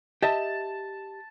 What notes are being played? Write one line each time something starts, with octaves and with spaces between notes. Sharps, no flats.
G4 D#5 E5 A5